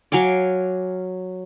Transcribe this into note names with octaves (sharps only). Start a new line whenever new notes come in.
F#3 F5 G#5 D6